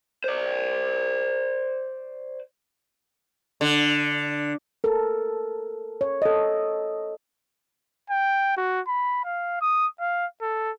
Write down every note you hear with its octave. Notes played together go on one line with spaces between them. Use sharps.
C5 D5
D3
A4 A#4
C#5
A4 D#5
G5
F#4
B5
F5
D#6
F5
A4